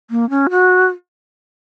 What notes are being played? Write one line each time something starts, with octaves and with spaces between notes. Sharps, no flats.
A#3
C#4
F#4